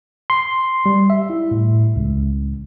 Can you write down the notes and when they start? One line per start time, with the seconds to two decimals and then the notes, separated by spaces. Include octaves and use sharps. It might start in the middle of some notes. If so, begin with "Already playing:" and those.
0.30 C6
0.86 G3
1.10 E5
1.30 E4
1.51 A2
1.96 C#2